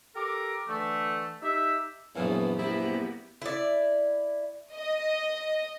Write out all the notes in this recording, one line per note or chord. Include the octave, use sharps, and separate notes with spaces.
G4 A4 A#4 D6
D3 E3 A3
D#4 G4 E5
A#1 F#2 E3 B3
A#3 B3 E4 G4 C5
E4 D5
D#5